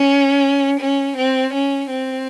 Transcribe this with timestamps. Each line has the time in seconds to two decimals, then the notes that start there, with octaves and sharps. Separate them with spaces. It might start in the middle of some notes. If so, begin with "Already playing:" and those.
Already playing: C#4
0.80 C#4
1.17 C4
1.54 C#4
1.90 C4